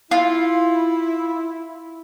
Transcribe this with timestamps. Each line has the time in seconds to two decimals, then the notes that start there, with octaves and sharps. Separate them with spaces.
0.11 E4 F4